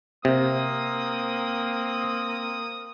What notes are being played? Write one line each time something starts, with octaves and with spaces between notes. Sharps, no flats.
C3 A#3 C4 D#6